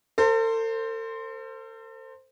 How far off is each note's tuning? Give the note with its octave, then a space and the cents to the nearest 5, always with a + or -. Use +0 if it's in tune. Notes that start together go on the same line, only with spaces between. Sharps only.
A4 +45 C5 +0